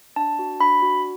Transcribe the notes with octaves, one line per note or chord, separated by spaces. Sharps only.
D4 A5
F#4
D4 B5
F#4